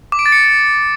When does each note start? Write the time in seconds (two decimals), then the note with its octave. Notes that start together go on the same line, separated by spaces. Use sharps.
0.12 D6
0.19 D7
0.26 A6
0.32 C#7